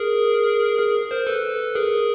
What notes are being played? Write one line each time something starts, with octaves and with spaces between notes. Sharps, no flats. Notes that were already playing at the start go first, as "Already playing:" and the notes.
Already playing: G#4 A#4
G#4 A#4
A#4 C5
A4 B4
G#4 A#4